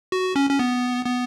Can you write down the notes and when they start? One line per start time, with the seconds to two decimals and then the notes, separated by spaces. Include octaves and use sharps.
0.12 F#4
0.36 C#4
0.50 C#4
0.59 B3
1.05 B3